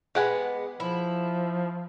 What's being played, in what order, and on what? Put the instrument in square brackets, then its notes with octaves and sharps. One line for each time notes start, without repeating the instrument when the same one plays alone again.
[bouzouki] G#3 B3 [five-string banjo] G4 F#5 G#5
[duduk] F3 [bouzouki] E4